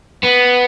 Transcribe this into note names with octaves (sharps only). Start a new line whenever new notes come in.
B3